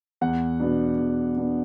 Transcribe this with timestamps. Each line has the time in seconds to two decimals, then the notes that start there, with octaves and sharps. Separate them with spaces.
0.21 E2 F#5
0.60 B2 B3 D4
0.98 E2
1.37 B2 B3 D4